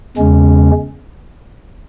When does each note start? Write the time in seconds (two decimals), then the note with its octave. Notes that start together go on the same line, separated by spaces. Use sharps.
0.17 E2 C#3 G#3 C#4